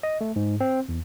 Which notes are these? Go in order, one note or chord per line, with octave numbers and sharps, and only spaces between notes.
D#5
A3
G#2
C4
E2